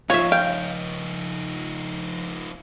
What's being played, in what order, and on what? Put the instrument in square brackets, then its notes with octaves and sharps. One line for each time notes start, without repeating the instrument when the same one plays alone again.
[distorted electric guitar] F3 D#4 [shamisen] F4 [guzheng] C#5 E5
[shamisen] F5 [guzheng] G5